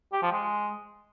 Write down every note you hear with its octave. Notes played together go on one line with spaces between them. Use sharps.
G4
F3
G#3